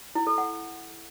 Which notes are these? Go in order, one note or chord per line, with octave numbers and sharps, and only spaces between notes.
E4
A4
F#5